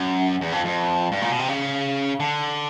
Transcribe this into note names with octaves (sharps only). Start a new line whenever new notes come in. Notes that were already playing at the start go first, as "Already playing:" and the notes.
Already playing: F#2
E2
F2
F2
G2
A#2
B2
C3
C#3
D3